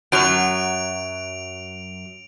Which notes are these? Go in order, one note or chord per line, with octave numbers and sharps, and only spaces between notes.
F#2 F#3 D7 F7